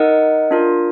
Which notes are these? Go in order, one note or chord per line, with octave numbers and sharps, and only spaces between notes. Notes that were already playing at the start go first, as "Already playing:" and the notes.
Already playing: D#4 A#4 D#5 F#5
D4 F4 A#4